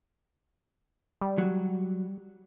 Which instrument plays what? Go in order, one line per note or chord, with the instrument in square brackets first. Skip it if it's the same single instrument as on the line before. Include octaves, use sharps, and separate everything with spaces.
[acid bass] G3
[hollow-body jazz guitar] F#3